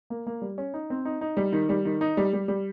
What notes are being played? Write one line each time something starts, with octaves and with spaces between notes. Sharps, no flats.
A#3
A#3
G3
C#4
D#4
C4
D#4
D#4
G3
D#3
G3
D#3
D#4
G3
G3
G3